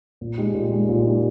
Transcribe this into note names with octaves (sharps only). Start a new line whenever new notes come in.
A#2
G#3 D#4 G4
A#2
G#3 D#4 G4
A#2
G#3 D#4 G4